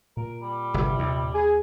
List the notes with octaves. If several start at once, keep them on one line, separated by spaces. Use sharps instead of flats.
A#2 A#4
G3
G1 C3
D#2
G#4 G#5